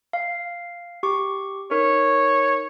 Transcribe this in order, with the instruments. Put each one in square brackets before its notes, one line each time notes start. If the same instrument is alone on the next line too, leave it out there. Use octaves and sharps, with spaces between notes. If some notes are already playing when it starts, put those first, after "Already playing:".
[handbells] F5
G4 C#6 D6
[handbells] D#4 A#4 [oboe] C#5